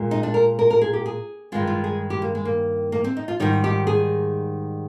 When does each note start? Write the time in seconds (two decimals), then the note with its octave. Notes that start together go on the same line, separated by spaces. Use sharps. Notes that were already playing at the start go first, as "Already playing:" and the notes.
Already playing: A#2 G#3
0.11 D#4
0.23 D4
0.34 A#4
0.59 A#4
0.70 A#4
0.82 G#4
0.93 G4
1.06 G#4
1.52 G2 D#3 G#3 F4
1.67 F4
1.84 G#4
2.10 G4
2.22 A#3
2.35 G#3
2.45 A#3
2.92 A#3
3.04 C4
3.17 D#4
3.28 F4
3.40 G#2 D#3 G3 D#4
3.64 G4
3.87 G#4